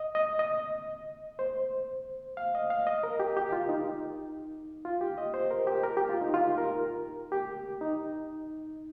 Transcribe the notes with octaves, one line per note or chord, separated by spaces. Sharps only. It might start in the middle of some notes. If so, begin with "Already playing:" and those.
Already playing: D#5
D#5
D#5
C5
F5
D#5
F5
D#5
A#4
G4
G4
F4
D#4
F4
G4
D#5
C5
A#4
G4
A#4
G4
F4
D#4
F4
A#4
G4
D#4